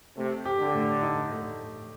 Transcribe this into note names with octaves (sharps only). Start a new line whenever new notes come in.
C3 A3
G4
D3
A2
D#4
A3